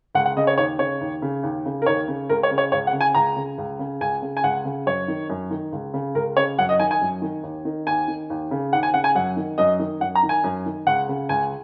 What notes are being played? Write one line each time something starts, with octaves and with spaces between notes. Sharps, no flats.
C#2 F#5
F#5
C#3 D#5
C#5
D#2 C#5
C#3 C#5
D#2
C#3
D#2
C#3
A#4
D#2 C#5
C#3
C#2 A#4
C#5
C#3
C#5
C#2 C#5
F#5
C#3
G#5
C#2 A#5
C#3
C#2
C#3
C#2 G#5
C#3
G#5
C#2 F#5
C#3
F#2 C#5
D#3
F#2
D#3
C#2
C#3
C#2 A#4
C#3 C#5
F#2 F#5
D#5
D#3 G#5
G#5
F#2
D#3
D#2
D#3
D#2 G#5
D#3
D#2
C#3
D#2 F#5
G#5
C#3 F#5
G#5
F#2 F#5
D#3
F#2 D#5
D#3
F#2 F#5
A#5
D#3
G#5
F#2
D#3
C#2 F#5
C#3
C#2 G#5